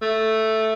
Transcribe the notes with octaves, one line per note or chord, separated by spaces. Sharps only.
A3